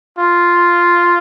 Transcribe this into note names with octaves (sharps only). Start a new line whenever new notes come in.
F4